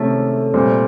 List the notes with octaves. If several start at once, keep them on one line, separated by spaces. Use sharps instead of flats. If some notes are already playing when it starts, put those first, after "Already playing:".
Already playing: C3 D#3 G#3 A3 C#4
A#2 G3 C4